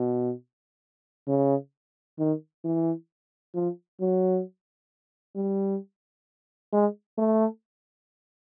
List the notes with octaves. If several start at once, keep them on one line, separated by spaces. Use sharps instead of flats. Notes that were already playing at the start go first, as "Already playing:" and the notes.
Already playing: B2
C#3
D#3
E3
F3
F#3
G3
G#3
A3